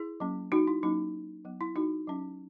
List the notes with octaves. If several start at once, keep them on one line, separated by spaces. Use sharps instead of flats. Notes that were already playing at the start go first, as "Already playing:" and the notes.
Already playing: E4 G#4
F#3 A#3 C#4
D#4 F#4
E4
F#3 A#3 C#4 D#4
F#3 B3
E4
D#4 F#4
F#3 C#4